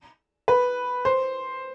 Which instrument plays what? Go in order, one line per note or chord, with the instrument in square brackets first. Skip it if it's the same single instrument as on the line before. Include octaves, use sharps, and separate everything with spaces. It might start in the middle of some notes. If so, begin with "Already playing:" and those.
[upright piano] B4
C5